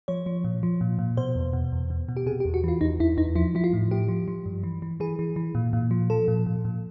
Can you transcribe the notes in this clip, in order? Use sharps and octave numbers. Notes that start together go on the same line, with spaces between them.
F3 C#5
F3
A#2
F3
A#2
A#2
B2 C5
E2
B2
E2
B2
B2
G4
C3 G#4
G4
E2
F#4
E3 F4
E2 D#4
E2 E4
E2 D#4
F3 E4
F3 E4
F4
A2
A2 G4
F3
F3
G2
E3
E3
E3 G#4
E3
E3
A#2
A#2
F3
F3 A4
A#2
A#2
A#2